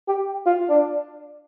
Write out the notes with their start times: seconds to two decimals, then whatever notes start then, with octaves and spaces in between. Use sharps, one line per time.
0.08 G4
0.46 F4
0.70 D4